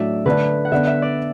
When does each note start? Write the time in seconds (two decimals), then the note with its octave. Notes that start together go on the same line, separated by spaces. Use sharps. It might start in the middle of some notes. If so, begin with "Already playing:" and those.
Already playing: A2 F#3 D4 D5 E5
0.25 D3 A3 D4 B4
0.65 F#5
0.72 D3 B3 D4 E5
0.87 E5
1.02 D5